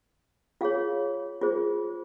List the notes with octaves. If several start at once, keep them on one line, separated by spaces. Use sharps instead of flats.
F4 G#4 C#5 F5
F4 G#4 C5